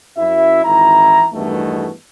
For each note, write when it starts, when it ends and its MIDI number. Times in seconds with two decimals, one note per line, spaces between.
0.17 0.62 42
0.17 0.62 64
0.17 0.62 76
0.64 1.26 32
0.64 1.26 52
0.64 1.26 64
0.64 1.26 82
1.33 1.90 40
1.33 1.90 43
1.33 1.90 47
1.33 1.90 51
1.33 1.90 52
1.33 1.90 57